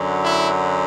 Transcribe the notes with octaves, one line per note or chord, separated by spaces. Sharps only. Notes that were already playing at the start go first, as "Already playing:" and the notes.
Already playing: F#2 D3 F#3
E4